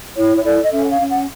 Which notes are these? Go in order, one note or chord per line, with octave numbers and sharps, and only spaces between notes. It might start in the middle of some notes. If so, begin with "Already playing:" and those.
E4 C#5
C#5
A4 D5
D#5
C#4 E5
F#5
F5
C#4
F#5